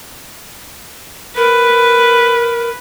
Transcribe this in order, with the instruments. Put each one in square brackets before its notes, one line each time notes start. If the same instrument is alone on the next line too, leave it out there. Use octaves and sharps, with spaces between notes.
[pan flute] A#4 [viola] B4